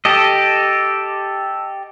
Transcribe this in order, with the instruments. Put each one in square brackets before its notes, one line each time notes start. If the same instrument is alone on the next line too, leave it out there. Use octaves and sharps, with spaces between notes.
[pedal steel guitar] G4 A4 D#5